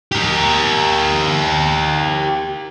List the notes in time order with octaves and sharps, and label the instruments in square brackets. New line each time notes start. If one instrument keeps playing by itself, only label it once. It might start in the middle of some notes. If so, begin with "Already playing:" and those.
[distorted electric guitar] G4 A#4